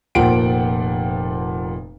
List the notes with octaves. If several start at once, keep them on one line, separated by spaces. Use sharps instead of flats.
F1 A#2 F3 F#5 G5 D7